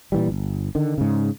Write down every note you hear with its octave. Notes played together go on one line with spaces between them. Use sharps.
A#2 E3 G3
G1
D3 D#3
G#2 C#3